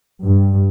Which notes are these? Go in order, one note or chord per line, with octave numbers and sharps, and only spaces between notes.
G2